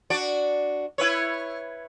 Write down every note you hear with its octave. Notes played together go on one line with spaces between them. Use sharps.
D4 F#4 D5
E4 B4 C#5